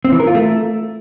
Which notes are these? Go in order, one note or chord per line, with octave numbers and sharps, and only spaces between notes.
C4
E3
A#4
F4
A3